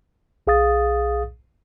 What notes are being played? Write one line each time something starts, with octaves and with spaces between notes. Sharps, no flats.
B1 G#4 F5 D#6 A6